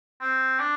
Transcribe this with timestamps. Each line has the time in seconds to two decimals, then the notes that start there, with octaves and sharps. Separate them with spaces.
0.21 C4
0.59 D4